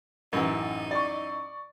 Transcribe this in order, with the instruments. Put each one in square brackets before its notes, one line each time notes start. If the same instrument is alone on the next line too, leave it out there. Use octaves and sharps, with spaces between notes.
[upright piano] A1 [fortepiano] F#2 E3 [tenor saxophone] D#4
[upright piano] D5 C#6